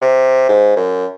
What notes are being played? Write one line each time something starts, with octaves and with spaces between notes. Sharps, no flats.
C3
G#2
F#2